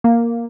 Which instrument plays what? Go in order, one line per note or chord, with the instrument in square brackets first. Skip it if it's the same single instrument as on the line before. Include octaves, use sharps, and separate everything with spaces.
[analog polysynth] A#3